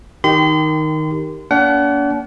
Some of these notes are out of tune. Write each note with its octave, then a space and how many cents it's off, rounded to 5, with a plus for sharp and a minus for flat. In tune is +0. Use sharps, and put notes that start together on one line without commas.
D#3 +0 G4 +0 C6 -40
A#3 +25 D4 -40 F#5 +30